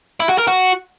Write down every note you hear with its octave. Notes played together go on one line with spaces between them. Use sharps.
E4
F#4
A#4
F#4